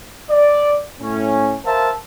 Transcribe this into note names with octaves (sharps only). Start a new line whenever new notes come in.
D5
A2 C#4
A#4 C5 E5 F5 A5